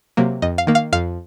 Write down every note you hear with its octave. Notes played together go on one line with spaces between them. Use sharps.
C3 F#3 A#3
F2 D#5
F5
D#3 A#3
F5
F2 F5